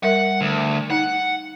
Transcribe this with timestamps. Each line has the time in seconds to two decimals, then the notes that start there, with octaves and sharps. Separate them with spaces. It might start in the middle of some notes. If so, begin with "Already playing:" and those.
0.03 G3 A#4 E5 F#5
0.41 D2
0.90 D#4 F#5